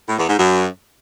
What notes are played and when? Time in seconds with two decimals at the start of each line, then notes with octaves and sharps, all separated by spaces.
0.08 A2
0.18 E2
0.27 G#2
0.37 F#2